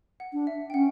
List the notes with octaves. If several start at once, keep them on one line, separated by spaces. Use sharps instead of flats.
F#5
D4
E5
G5
C#4 F#5